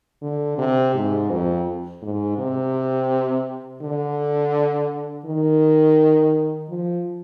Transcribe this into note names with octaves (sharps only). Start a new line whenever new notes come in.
D3
C3
G#2
F2
G#2
C3
D3
D#3
F3